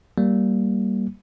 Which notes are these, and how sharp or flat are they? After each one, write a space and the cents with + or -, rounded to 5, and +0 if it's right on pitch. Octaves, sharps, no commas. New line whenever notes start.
G3 -10 A#3 +0